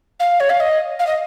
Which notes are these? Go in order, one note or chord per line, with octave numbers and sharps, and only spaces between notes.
F5
C#5
F5
D#5
F5
D#5